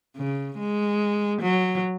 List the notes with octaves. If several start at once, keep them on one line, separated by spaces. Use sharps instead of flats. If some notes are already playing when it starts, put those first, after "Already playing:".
C#3
G#3
F#3